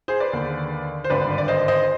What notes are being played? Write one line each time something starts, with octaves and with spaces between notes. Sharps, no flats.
G#4 C5
B4 D5
D#2 D3
C5
G#1 G2 D3 B4 D5
D5
C5 D#5
C5 D#5